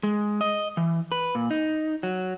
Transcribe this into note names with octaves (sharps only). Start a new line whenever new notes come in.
G#3
D#5
E3
B4
A#2
D#4
F#3